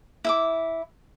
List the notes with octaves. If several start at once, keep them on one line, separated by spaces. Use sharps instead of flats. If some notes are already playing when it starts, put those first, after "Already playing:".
E4 E5 D6